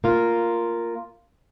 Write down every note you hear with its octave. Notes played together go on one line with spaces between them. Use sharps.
A#3 F4